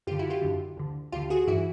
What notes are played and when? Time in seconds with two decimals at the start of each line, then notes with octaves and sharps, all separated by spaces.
0.07 F#2 D3 F4 G4
0.19 E4 F#4
0.30 F4 G4
0.42 F#2 D3
0.77 D2 D3
1.12 D2 D3 F4 G4
1.30 F#4 G#4
1.47 G2 E3 E4 F#4